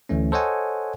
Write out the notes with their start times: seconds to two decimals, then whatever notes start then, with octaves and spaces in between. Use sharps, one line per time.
0.09 D2 E3 A3 C#4
0.32 A4 C5 C#5 D#5 F#5 G#5